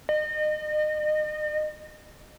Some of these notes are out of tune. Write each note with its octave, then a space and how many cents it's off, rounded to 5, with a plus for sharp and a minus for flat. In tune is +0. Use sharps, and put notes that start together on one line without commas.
D#5 -35